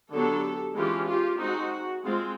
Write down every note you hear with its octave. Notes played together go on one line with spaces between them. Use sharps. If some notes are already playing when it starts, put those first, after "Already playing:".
D3 F#3 B3 D4 G4 A4
E3 G#3 C#4 F4 G4
F4 G4
G#3 C4 D#4 F#4
G#3 C4 F4